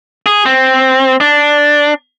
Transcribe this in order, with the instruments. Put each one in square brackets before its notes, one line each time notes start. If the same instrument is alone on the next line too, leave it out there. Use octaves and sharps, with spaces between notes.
[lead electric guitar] G#4
C4
D4